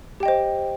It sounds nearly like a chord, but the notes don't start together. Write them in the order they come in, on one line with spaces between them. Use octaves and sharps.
G4 G5 D#5 C5